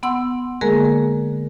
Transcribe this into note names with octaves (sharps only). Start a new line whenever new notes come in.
B3 F#5 C6 E6
D3 G#3 A#3 G#4 A#4